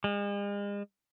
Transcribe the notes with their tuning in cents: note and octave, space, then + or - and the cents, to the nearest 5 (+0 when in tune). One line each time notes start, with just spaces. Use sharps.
G#3 -40